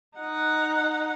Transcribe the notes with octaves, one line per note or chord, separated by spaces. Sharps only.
D#4 F#5